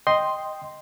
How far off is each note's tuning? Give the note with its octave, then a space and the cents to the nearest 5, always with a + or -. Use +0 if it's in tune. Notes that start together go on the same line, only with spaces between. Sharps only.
D#5 +0 G5 +0 C6 +0